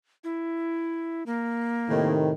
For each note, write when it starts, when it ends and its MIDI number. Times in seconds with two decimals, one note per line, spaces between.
0.24 1.23 64
1.26 2.12 58
1.90 2.32 45
1.90 2.32 48
1.90 2.32 51